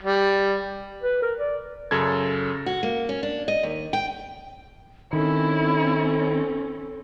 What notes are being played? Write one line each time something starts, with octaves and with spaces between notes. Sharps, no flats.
G3
B4
A#4
D5
F#2 C#3 A4 G#6
F#4
A#3
C#4
D4
D#5
D#2
G5
D#3 C4 C#4 E4 A4